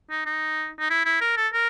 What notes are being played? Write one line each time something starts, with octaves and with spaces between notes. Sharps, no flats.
D#4
D#4
D#4
E4
E4
A#4
A4
A#4